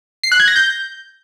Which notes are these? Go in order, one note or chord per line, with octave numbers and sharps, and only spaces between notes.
C7
F#6
G#6
A#6
G6